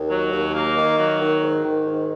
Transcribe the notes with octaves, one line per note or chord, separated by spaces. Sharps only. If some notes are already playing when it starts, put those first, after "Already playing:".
Already playing: D#2
F#3
D#2
A#3
D#3
F#3
D#3
G#2
D#3
G#2